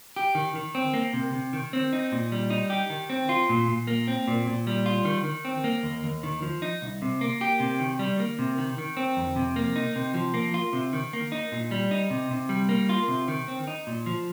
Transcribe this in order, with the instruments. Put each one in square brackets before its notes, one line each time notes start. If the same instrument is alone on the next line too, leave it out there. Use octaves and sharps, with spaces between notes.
[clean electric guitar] G4
D#3
D#3
C4
A#3
C3
C3
D#3
C4
D#4
A#2
G3
D#4
G4
D#3
C4
F4
A#2
A#2
A#3
C4
A#2
A#2
G3
F4
D#3
D#3
C4
A#3
D#2
D#2
D#3
F3
D#4
C2
C3
A#3
G4
C3
D#3
G3
A#3
C3
D#3
D#3
C4
F2
C3
A#3
D#4
C3
F3
A#3
F4
C3
D#3
A#3
D#4
A#2
G3
D#4
C3
C3
G3
A#3
F4
C3
D#3
C4
D#4
A#2
F3